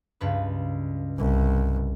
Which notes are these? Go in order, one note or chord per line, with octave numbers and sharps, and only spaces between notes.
C#2 G2 B4
C2